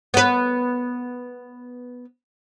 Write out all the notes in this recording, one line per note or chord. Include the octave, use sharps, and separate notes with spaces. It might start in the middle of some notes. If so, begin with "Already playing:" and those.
B3 B4